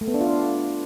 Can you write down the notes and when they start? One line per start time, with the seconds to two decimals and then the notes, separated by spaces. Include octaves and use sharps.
0.01 A3
0.08 B3
0.14 D4
0.21 F4
0.27 D4